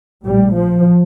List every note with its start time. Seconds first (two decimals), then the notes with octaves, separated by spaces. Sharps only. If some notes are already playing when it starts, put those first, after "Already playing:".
0.24 A#1 A2 G3
0.55 F3